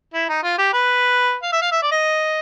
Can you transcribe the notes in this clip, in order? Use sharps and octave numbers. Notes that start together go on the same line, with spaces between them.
E4
D#4
F4
G4
B4
F5
E5
F5
E5
D5
D#5